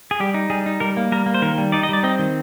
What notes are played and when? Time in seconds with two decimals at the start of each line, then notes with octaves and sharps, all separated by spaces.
0.11 G#4
0.20 G3 G4
0.34 D#4
0.50 G3 G#4
0.66 D#4
0.80 G3 A#4
0.97 A#3
1.12 G3 A#4
1.26 A#3
1.34 C5
1.42 D#3 A#4
1.58 G3
1.72 D#4 D5
1.83 D#5
1.89 G3 D5
2.04 C4 D#5
2.19 D#3